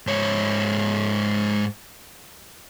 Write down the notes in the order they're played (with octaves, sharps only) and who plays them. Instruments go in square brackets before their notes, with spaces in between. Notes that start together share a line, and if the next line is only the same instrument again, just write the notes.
[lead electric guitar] G#2 C#5